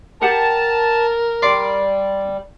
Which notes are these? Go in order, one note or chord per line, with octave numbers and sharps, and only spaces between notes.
G4 A#4 F#5 G5 A5
G3 D5 C6 D6